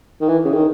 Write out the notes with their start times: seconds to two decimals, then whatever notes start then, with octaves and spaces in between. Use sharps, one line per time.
0.21 D#3
0.29 E3
0.45 C#3
0.54 D#3